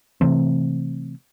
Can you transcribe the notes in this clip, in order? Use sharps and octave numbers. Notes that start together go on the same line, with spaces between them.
C3 E3 A3 C4